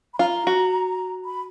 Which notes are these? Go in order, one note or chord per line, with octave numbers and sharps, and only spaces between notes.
B5
F4 A#5
F#4
B5